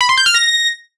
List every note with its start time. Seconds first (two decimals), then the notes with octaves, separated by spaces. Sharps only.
0.01 B5
0.09 C6
0.17 G6
0.26 F6
0.34 A#6